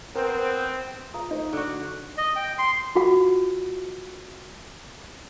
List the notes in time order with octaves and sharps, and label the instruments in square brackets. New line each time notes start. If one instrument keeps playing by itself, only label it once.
[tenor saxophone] B3 [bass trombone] C4 [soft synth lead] A#4 [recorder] C5
[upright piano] F4 A#5 D#6
D#4 C5
[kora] D3 F#4
[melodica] D#5
G5
C6
[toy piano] F4 F#4 F#5